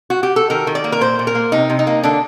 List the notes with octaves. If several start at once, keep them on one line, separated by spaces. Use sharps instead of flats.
F#4
G4
A4
D#3 A#4
D#3
D5
A#3
A#4
A#2 C5
A#2
A#4
A#3
C3 D#4
C3
D#4
A#3
D3 D4